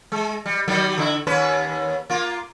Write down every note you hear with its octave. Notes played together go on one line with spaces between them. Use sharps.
G#3
G3
D#3 F#3 G3
D3 E4
D#2 C#4 B4
A#3 F4